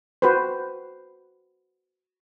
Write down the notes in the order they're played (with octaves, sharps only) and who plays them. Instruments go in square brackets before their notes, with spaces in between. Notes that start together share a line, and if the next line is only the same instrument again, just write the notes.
[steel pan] F#4 B4 C5